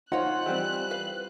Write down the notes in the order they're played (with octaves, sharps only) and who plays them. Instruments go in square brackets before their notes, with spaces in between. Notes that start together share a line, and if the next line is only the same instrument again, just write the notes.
[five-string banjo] D#4 [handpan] F4 C5 [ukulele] C#5 F#5 [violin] F#6
[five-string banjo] E3 G3 C4 [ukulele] G4
[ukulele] B4 F5